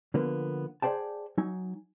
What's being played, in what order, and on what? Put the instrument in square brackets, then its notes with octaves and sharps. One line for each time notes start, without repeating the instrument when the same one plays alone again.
[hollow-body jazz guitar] D3 F3 A#3 B3
G#4 C5 D5 G5 A5
F#3 D#4 G#5